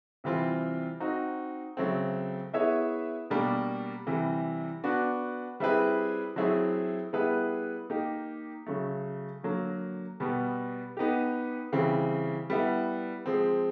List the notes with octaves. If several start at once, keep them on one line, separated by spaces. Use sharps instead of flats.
C3 E3 G3 C4 F4
C4 D#4 F#4
C#3 F#3 A3 C4
B3 E4 G#4 C#5 E5
B2 G3 A#3 D4
C3 E3 G3
B3 D4 F#4
G3 C4 E4 G#4 B4
F#3 A3 C4 E4 G#4
G3 B3 E4 G#4 B4
A#3 D#4 G4
C#3 F#3 A3
D3 F#3 A#3
B2 G3 B3
B3 D#4 G4
C#3 E3 G3 C4
G3 B3 E4
F3 G#3 C4